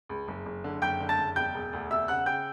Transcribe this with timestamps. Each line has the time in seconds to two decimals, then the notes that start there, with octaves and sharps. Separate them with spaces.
0.09 C#2
0.28 F#1
0.46 F#1
0.64 D3
0.82 F#1 G5 G6
1.00 D3
1.09 A5 A6
1.18 F#1
1.36 E1 G5 G6
1.54 E1
1.73 D2
1.90 E1 E5 E6
2.08 C#3 F#5 F#6
2.26 C#3 G5 G6